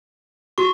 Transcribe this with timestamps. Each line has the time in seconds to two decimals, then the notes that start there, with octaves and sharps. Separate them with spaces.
0.58 F#4 C#6